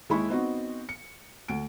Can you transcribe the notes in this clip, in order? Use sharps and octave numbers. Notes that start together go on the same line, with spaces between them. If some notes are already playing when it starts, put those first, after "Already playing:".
D#2 G#3 E4 B5 C#6
B3 C4 D#4 F#4
C#7
D2 D7